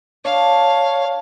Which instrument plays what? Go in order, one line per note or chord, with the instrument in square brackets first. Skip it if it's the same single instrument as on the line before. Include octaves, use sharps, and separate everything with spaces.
[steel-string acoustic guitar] D4 [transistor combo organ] C#5 [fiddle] F5